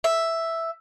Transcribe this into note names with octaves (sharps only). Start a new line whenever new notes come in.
E5